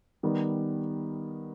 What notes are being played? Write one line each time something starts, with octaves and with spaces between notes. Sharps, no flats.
D#3 G3 B3